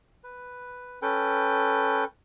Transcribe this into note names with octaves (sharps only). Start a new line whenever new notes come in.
B4
C#4 A4 B4 G5